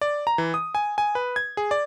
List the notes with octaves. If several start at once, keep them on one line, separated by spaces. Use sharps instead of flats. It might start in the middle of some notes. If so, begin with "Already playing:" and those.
D5
A#5
E3
D#6
G#5
G#5
B4
G#6
G#4
D5